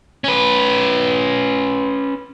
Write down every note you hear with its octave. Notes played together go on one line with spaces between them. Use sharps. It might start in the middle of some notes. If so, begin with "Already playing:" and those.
C#4 B4